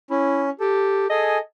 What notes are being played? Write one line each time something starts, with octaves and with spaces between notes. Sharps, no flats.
C#4 E4
G4 A4
G#4 A4 D#5 G#5